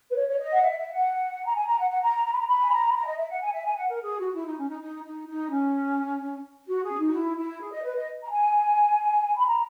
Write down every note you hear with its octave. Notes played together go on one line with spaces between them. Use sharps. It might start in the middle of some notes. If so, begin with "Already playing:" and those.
B4
C#5
C#5
D#5
F#5
E5
E5
F#5
A#5
G#5
A#5
F#5
F#5
A#5
A#5
B5
A#5
B5
G#5
A#5
B5
A#5
D#5
E5
F#5
G#5
E5
G#5
F#5
A#4
G#4
F#4
E4
D#4
C#4
D#4
D#4
D#4
D#4
C#4
F#4
G#4
C#4
D#4
F#4
E4
E4
G#4
D#5
B4
D#5
A#5
G#5
B5
A#5